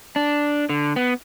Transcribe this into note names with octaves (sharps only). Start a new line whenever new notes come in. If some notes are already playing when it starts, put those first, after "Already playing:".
D4
D3
B3